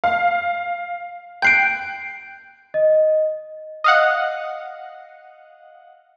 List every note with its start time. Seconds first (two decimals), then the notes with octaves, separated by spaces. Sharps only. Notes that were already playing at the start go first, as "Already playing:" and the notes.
0.04 F5
1.42 G5 F#6 G6 C7 D7
2.74 D#5
3.84 D#5 F5 F#5